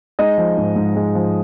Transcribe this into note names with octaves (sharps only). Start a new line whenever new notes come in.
G#3 D#4 D#5
F3
G#2
G#2
G#3
F3